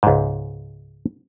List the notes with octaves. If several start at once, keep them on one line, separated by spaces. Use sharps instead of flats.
C#2 G#2